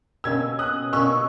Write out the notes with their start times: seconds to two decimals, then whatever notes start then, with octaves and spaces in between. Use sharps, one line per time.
0.24 B2 A#3 C#4 E6 G#6
0.59 D#6 F#6
0.92 B2 A#3 C#4 C#6 E6